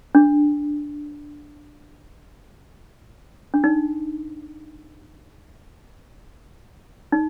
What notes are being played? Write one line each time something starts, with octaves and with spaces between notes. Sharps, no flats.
D4
D4
D#4
D#4